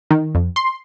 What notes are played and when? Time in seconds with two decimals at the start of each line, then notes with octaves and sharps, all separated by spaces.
0.11 D#3
0.35 F2
0.56 C6